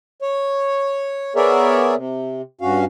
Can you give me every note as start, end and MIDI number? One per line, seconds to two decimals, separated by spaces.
0.22 1.33 73
1.36 1.95 59
1.36 1.95 68
1.36 1.95 70
1.36 1.95 73
1.36 1.95 74
1.36 1.95 76
1.95 2.42 48
2.61 2.85 43
2.61 2.85 61
2.61 2.85 66
2.61 2.85 77